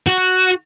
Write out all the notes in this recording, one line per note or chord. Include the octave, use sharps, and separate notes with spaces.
F#4